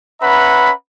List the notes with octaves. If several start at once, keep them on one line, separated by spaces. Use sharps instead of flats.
C#4 B4 E5 F#5 A#5 B5